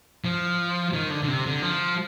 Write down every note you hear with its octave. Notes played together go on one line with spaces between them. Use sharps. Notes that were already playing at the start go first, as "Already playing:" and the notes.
F3
D#3
D3
D3
C3
D3
F3